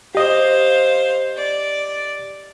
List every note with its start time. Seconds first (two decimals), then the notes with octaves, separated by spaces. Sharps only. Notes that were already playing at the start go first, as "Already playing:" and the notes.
0.15 G4 C5 D#5 F5
1.37 D5